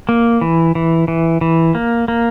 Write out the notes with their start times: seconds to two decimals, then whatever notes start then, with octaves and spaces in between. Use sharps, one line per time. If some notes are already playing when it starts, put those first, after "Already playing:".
0.09 A#3
0.41 E3
0.75 E3
1.08 E3
1.41 E3
1.75 A#3
2.08 A#3